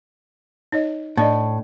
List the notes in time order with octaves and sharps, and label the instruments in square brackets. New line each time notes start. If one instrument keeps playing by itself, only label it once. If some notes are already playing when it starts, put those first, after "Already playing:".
[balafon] D#4 C#5 D#5
[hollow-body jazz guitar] A2 [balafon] D4 D5 D#5